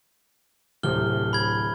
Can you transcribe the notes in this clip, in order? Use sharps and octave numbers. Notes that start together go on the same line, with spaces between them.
D1 C3 F6 G7
B5 G#6